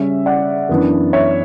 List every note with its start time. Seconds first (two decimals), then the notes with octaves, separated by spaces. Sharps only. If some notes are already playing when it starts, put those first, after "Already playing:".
Already playing: C#3 G3 C#4 E5
0.26 D5 F#5
0.69 F#2 E3 B3 D4
1.13 C#5 E5